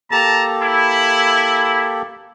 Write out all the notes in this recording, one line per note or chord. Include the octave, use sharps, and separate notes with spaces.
A#3 G4 A4 A5 A#5
E4